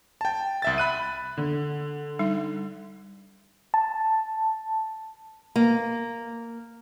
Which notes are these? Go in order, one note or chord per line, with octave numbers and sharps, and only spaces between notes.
G5 A5
C2 E5 A6
B5 F#6 D#7
D3
G3 D#4
A5
A#3